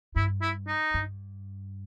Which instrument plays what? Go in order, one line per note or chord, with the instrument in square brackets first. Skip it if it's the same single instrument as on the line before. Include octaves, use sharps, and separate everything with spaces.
[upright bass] G2 [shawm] E4
[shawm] E4
D#4
[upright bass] G2